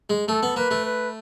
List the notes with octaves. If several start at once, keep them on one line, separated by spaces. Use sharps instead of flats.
G#3
A3 A4
B3
A#3 B4
A3
B4